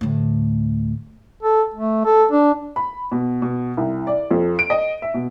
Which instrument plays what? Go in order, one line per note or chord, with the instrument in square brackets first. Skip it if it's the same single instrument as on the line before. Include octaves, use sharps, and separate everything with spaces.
[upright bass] D2 A2
[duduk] A4
A3
A4
D4
[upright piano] B5
B2
B2
C2
D5
F2
D7
D#5
E5
B2